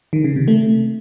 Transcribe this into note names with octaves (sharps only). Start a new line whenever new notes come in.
D#3
C#3
C3
A3